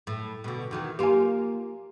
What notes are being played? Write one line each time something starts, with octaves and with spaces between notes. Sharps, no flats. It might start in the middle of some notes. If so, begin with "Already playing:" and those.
A2
B2 D3
E2 D#3 F#3
A#3 F4 G4 G#5